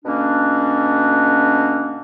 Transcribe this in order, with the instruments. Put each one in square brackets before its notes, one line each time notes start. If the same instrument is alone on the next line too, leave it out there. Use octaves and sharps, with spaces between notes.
[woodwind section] B2 D3 A#3 C#4 D4